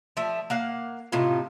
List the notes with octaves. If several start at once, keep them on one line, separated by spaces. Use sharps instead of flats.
F3 A3 E5
A#3 F5 F#5
A2 C3 D#4 F4